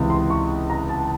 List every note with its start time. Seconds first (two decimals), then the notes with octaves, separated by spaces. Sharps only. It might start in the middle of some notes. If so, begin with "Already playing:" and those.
Already playing: C#2 C3 E3 G#3
0.10 C6
0.30 C#6
0.70 A#5
0.89 A5